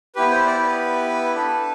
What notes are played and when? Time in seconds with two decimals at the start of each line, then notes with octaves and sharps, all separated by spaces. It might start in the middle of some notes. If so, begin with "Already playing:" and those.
0.16 B3 E4 G4 B4
0.31 C5
0.46 D5
0.61 B4
1.34 D4 A4